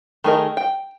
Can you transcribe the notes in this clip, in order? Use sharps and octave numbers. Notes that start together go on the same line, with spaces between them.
D#3 A3 G#4 A#4 D#5
G5